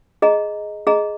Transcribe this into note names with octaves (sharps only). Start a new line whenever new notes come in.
G#4 D#5 A#5
G#4 D#5 A#5